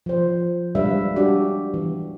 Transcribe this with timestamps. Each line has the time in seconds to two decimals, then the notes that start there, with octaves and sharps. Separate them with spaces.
0.06 F3 C5
0.75 G3 G#3 D4 B4 E5 F5
1.16 G3 D4 F#4 G4
1.74 E3 B3